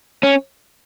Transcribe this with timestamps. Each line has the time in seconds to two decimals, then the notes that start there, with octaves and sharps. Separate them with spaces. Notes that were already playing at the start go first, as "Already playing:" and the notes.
0.23 C#4